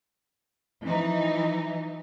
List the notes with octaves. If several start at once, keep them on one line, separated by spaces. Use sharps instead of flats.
E3 F3 D#4